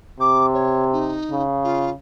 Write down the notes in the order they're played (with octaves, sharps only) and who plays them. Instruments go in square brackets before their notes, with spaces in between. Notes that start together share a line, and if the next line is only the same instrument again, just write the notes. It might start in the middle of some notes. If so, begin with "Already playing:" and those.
[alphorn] C3 [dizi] D6
[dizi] C#5
D#4
[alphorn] C#3
[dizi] F4